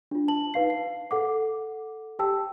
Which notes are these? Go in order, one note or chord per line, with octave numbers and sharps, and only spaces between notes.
D4 F4
A5 F#7
D#4 B4 F5 C7
C7
A4 F#5 D6
G4 G5 A5 E6